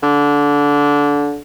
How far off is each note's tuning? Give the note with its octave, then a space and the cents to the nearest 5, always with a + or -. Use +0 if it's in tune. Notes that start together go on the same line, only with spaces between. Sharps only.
D3 -20